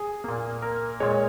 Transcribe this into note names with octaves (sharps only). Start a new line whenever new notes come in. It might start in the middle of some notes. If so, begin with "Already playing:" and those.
Already playing: G#4
A#2 A#3
A#4
A#2 G#3 C#5